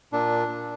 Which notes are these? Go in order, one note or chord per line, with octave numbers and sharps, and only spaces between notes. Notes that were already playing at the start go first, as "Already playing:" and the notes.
A#2 D4
A#2